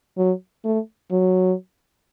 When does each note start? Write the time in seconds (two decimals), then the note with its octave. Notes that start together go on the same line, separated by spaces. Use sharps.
0.18 F#3
0.64 A3
1.11 F#3